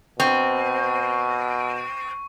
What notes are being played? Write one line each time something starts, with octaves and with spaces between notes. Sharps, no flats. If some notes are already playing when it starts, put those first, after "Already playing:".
B2 C4 C#6